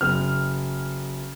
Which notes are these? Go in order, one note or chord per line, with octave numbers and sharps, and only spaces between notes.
F#1 F6